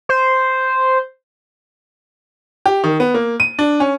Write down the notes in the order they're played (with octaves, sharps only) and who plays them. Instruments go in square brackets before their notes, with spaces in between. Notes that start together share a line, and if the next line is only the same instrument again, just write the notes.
[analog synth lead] C5
[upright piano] G4
D#3
B3
A#3
D#7
D4
C#4